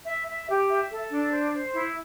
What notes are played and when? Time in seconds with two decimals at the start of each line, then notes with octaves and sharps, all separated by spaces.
0.06 E5
0.28 E5
0.48 G4
0.69 E5
0.90 A4
1.11 D4
1.32 C5
1.53 C5
1.74 E4